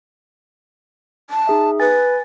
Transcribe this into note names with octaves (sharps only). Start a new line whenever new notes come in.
A5
D#4 G#4 E5
B4 G#5 A6